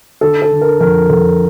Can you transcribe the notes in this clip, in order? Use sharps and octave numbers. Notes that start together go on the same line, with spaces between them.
D3 A4
A4
D3
A#4
F2 A#4
F2 A4